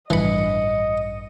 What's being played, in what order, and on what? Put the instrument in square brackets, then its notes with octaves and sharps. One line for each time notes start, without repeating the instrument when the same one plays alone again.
[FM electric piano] A1 G2 C#7 [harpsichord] E3 B5 [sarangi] D#5